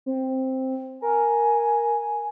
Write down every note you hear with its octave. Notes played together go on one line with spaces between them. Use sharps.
C4
A#4 G#5